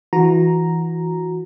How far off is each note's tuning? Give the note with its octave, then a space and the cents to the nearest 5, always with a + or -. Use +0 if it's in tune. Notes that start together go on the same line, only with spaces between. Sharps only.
E3 +0 F#4 -20 A#5 +0